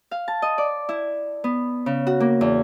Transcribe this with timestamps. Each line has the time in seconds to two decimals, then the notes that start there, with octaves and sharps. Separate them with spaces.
0.11 F5
0.28 A5
0.42 D#5
0.58 D5
0.89 E4
1.44 B3
1.86 C#3
2.07 F#4
2.20 A#3
2.41 E2